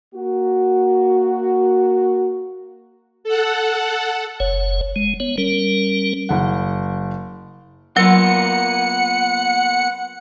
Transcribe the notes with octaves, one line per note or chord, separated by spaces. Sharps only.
A#3 F#4
A4 F#5
F#1 C#5
G#3
B3 C#5
G3 C#4 A#4
F#1 F#5
F#3 A#3 B3 F4 F#5 E6 C#7